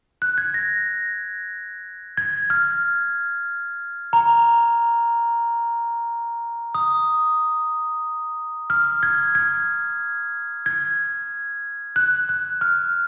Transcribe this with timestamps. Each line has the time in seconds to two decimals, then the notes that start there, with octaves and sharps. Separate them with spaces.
0.22 F#6
0.38 G#6
0.54 A#6
2.18 G#6
2.50 F6
4.13 A#5
6.75 D#6
8.70 F6
9.03 G#6
9.35 G#6
10.66 G#6
11.96 F#6
12.29 F#6
12.61 F6